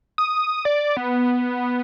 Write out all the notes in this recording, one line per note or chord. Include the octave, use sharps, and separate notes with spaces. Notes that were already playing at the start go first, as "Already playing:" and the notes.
D#6
D5
B3